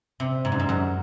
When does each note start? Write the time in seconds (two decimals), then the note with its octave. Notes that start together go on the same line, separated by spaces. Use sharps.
0.20 C3
0.45 G#2
0.52 F#2
0.60 G#2
0.69 F#2